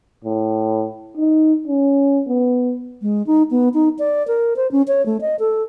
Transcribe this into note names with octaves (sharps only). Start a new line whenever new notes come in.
A2
D#4
C#4
B3
G#3
D#4
B3
D#4
D5
A#4
C5
C#4
C#5
A3
D#5
A4